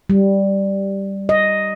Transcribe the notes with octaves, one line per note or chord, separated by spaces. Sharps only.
G3
D#5